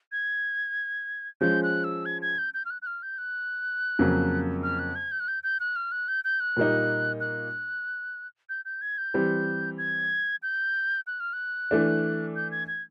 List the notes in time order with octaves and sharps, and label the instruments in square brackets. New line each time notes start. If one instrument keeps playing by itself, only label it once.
[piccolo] G#6
[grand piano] F3 G#3 C#4 [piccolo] G6
[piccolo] F#6
E6
G#6
G#6
G6
G6
F6
F#6
F#6
F6
G6
F#6
[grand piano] F2 C#3 F#3 A#3
[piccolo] F6
F#6
G#6
G6
F#6
G6
G6
F#6
F6
F#6
G6
G6
F#6
[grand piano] A#2 G3 A#3 D#4
[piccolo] F#6
G6
G6
G#6
G6
[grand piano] E3 G3 C4
[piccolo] G#6
G6
F#6
F6
F#6
[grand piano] E3 A3 D4
[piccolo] G6
G#6
G#6